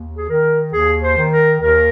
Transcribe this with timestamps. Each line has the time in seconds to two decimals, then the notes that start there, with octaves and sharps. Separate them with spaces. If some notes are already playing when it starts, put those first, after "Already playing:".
Already playing: D#2
0.17 G#4
0.30 D#3 A#4
0.73 D#2 G#4
1.02 C5
1.16 D#3
1.32 A#4
1.61 D#2 A#4